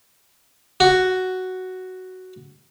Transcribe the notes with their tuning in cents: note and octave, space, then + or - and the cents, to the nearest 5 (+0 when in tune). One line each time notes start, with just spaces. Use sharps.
F#4 +5